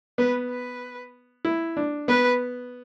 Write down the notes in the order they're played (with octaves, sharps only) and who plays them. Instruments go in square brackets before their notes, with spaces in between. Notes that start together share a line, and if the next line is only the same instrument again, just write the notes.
[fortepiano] B3 [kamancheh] B4
[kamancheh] B4
[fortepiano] E4
D4
[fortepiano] B3 [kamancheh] B4